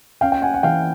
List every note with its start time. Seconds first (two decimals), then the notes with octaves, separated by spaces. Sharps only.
0.21 C#4 F5 G5
0.32 G5
0.42 F#5 G#5
0.54 F#5
0.63 E3 F5 G5